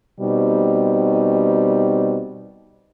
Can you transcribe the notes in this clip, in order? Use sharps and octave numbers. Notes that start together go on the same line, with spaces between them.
B2 G3 C4 D#4